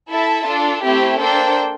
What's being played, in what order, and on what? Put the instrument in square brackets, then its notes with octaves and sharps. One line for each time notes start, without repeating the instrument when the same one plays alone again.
[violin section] E4 A4 E5 A5
D4 F4 A4
A3 C4 E4 G4
A#3 D4 A4 C5 G5